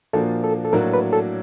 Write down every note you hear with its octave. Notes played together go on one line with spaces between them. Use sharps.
A#2 F3 A#3 D4 F#4 A4
A4
A4
A2 F#3 A#3 D4 F#4 A#4
B4
A4